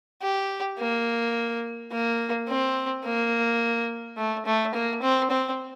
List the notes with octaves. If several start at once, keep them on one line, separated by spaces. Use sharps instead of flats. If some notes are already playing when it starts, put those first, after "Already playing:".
G4
A#3
A#3
C4
A#3
A3
A3
A#3
C4
C4